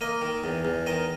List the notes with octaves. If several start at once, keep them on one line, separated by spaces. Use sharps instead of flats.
A#3 D#5
D#3
E2
E2
D#3 D#5